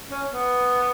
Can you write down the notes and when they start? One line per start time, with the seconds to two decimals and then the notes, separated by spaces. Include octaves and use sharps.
0.10 C#4
0.29 B3